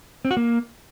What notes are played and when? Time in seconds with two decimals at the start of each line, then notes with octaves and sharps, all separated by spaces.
0.25 C4
0.31 F#4
0.37 A#3